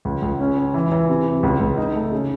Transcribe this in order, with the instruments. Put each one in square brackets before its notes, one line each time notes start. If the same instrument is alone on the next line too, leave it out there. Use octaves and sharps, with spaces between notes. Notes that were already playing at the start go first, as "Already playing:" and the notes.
[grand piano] C#2
C#2
C#4
C#4
E3
E3
C3
C3
C#2
C#2
D#4
A3
C#3